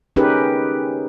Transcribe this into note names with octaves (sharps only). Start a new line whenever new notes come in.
C#4 D#4 G4 G#4 A#4 B4